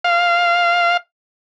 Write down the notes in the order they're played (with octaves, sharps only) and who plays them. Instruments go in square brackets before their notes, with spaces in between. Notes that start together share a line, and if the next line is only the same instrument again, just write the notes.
[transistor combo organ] F5